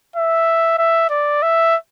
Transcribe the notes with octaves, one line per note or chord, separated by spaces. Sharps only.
E5
E5
D5
E5